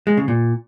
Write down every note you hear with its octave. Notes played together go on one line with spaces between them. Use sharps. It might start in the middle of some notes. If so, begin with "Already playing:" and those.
G#3
C#3
A#2